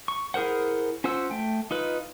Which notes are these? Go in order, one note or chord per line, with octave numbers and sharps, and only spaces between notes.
C#6
E4 G#4 A#4 C5 F#5
C#4 F4 C5 F#5 E6
A3 G5
D#4 F4 B4